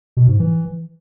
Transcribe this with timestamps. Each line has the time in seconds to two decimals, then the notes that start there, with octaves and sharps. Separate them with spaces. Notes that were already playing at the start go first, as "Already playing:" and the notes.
0.17 B2
0.28 G#2
0.40 E3